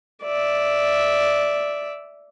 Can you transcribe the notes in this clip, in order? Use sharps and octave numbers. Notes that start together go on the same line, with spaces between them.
D5 E5